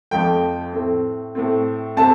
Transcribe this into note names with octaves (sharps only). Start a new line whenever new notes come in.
F2 F3 A3 G5
A2 A3 C4
A2 A3 C4
C3 A3 C4 A5